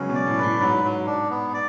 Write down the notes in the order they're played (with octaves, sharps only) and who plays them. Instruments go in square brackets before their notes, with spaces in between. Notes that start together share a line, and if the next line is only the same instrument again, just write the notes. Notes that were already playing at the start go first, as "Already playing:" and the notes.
Already playing: [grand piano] C#3 F#3 G#3 B3 [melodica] C#4
[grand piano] B2
[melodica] D5
[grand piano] A2
[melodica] B4
[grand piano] A2
[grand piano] G#2 [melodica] F#3
[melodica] F#3
D4
B3
D5